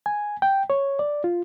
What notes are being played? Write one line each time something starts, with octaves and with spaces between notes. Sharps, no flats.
G#5
G5
C#5
D5
F4